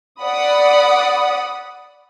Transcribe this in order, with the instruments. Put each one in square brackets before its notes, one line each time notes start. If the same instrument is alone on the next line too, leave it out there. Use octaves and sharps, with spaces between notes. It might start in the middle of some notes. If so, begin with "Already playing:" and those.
[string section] D5 F#5 B5 D#6